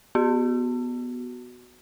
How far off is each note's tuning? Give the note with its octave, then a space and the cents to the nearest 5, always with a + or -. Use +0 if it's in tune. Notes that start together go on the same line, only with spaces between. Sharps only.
B3 +0 F#4 +0